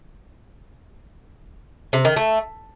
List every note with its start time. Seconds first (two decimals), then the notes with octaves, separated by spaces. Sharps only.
1.93 C3
2.05 D#3
2.16 A3